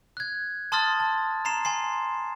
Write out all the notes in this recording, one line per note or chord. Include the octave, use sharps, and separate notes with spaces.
F#6 G#6
A5 C6 D#6 F6 A6
A5
A#5 C6 C7 E7
G#5 C6 C7